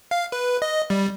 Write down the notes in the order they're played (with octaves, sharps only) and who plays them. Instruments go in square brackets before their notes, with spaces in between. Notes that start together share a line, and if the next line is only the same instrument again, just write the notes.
[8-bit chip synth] F5
B4
D#5
G3